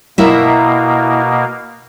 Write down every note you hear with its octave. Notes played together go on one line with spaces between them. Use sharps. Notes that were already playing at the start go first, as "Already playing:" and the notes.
B2 A#3 E4 A#4 E5